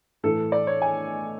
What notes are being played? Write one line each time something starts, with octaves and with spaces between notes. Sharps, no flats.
A2 E3 A4
D5
C#5
G#5